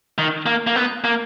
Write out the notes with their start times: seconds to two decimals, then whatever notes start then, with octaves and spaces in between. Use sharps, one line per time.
0.18 D#3
0.46 A#3
0.67 A#3
0.76 B3
1.04 A#3